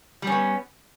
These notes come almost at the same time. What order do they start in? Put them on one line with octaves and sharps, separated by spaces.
G3 C#4 B3